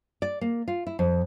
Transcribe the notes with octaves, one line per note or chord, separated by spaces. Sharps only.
D5
A#3
F4
E4
F2